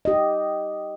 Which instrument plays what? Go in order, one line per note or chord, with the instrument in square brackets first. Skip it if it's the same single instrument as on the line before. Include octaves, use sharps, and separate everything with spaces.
[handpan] G4 D#5